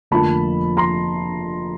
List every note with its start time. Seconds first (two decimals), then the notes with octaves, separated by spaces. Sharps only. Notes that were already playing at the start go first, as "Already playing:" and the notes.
0.11 F1 F2 D3 F3 A#3 A5 B5
0.77 A#5 C6